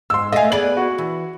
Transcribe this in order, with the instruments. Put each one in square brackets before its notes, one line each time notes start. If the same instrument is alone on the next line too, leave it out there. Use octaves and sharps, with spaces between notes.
[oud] G#2 [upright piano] C6 E6
[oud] A3 F5 [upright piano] D#5 G#5
[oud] B3 G#4 D5 [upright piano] F#7
[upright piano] F#4
[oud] E3